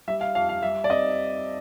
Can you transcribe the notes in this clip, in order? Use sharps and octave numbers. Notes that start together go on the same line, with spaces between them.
G3 E5
F5
F2 F5
F5
G3 E5
D5
C4 D#5